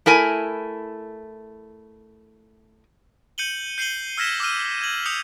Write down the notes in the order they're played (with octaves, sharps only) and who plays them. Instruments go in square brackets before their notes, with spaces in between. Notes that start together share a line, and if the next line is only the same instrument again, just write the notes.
[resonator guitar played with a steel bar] A3 E4 A#4 G#5
[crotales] G6 C#7 D#7 F#7 G7
G6 C7 C#7 D#7 F#7 G7
E6 F6 G#6 A#6 B6 E7
D6 E6 F6 D#7
G#6 F#7
D#6 F6 G6 C#7 F7